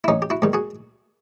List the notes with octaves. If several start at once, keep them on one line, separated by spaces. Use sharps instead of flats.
E4
A1 C#4 D#4
G4
E4 F#4
G#2 D#3 G3
F#4 G#4